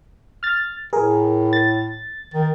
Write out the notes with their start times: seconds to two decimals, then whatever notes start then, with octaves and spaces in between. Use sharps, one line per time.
0.43 F6 A6
0.93 A2 G#4 A#4
1.53 A6
2.34 D#3